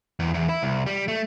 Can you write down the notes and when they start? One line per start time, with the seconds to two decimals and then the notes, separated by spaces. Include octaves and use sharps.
0.20 E2
0.34 E2
0.49 E4
0.63 C2
0.86 G3
1.08 A3